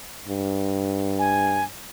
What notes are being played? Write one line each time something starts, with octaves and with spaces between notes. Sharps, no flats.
G2
G#5